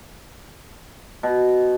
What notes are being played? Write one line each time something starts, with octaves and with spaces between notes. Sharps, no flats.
B2